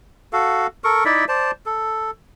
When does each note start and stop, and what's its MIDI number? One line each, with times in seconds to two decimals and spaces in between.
0.33 0.67 66
0.33 0.67 69
0.33 0.67 77
0.84 1.04 69
0.84 1.04 70
0.84 1.04 85
1.05 1.25 63
1.05 1.25 64
1.05 1.25 74
1.05 1.25 76
1.28 1.51 72
1.28 1.51 74
1.28 1.51 81
1.66 2.11 69